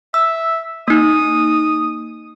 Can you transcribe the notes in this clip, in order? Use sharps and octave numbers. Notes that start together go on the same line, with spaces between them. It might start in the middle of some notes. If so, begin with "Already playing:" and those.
E5 E6
A#3 D#4 D#6